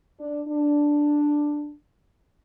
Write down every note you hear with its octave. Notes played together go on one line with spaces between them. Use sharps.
D4
D4